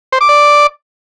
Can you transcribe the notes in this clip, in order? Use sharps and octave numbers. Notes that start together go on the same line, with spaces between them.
C5
D6
D5